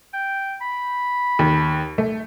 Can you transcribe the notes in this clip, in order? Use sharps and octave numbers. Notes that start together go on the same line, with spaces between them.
G5
B5
D#2
A3